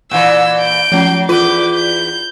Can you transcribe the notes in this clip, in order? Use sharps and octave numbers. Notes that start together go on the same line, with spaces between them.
A#2 E3 E6
G6 D7
F3 F#3 C#4
E2 F4 B4 D6 G6
G6